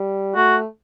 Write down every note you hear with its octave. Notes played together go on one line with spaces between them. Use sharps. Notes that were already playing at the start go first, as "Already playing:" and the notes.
Already playing: G3
A3 F#4